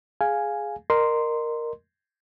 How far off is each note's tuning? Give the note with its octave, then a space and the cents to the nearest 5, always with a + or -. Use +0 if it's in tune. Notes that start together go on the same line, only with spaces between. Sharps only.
G#4 +0 F5 +0 G#5 +0
A#4 +0 D#5 -35 C6 +0